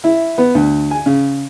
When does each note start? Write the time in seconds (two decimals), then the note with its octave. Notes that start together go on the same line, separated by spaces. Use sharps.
0.04 E4
0.38 B3
0.55 D2
0.91 G#5
1.06 C#3